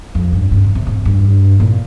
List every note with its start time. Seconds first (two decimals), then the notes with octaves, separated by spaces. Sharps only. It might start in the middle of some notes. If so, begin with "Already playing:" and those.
0.15 F2
0.32 G2
0.51 G2
0.63 C#3
0.75 C3
0.87 G#2
1.05 G2
1.60 A#2